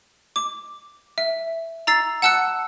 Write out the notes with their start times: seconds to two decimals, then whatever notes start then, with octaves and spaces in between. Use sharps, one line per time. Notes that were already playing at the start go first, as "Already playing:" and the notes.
0.36 D6
1.18 E5
1.87 A#5 E6 A6 C7
2.22 F#5 A5 E6 F#6 C#7